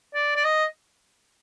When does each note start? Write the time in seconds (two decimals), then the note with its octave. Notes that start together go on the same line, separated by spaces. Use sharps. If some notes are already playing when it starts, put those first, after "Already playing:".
0.15 D5
0.36 D5
0.45 D#5